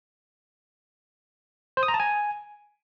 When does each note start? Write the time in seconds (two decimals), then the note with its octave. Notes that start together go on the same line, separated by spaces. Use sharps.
1.77 C5
1.83 D#6
1.88 A#5
1.94 A5
2.00 G#5